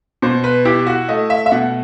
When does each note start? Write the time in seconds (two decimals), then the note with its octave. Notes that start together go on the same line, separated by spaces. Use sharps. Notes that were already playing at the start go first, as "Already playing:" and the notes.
0.22 B2 C5
0.44 B4
0.65 E4 G4
0.87 F#4
1.09 A3 D#5
1.30 E5
1.46 E5
1.52 B2 F#5